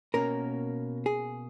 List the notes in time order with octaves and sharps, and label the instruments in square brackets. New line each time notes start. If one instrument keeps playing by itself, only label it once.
[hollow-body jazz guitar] B2 A#3 C#4 A#4
G#4